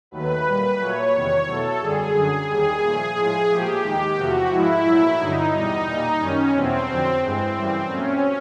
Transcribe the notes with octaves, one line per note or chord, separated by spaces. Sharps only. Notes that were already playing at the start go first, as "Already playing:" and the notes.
D#2 D#3 F#3 A3 B4
A#2 G3
A#2 F#3 A3 C#5
E2 C3 D#3 G3
E2 B2 F#3 A3 A4
F#2 D3 G3 G#4
F#2 D3 F#3
D#2 D#3 G3 G#4
A#2 F3 A3
A2 F3 G#3
A#2 F3 A3 G4
D#2 D#3 G#3
E2 C3 F3 A3 F#4
G#2 F3 G#3 E4
A#2 F#3 A3
G2 D3 F#3 D#4
E2 B2 G3 D#4
A#2 G3
F#2 D#3 G3 C#4
E2 B2 F#3 A3 C4
F2 D3 F#3
G2 E3 G#3 C4
F#2 C#3 E3 G3
A#2 F#3 A3 C#4